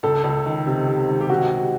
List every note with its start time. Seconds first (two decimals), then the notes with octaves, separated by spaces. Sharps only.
0.03 C#2 A4
0.24 C#2
0.46 D#3
0.67 C3
0.88 C3
1.09 D#3
1.21 G4
1.29 D#3 F#4
1.51 C#2